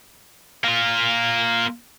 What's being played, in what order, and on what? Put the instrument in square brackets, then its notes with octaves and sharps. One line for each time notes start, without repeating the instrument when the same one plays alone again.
[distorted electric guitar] A#3 F4